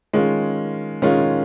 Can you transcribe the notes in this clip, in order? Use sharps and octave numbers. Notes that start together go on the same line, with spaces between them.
D#3 G#3 C#4 F4
D#3 G#3 C#4 F4